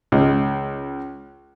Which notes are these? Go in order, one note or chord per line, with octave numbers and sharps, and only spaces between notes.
C#2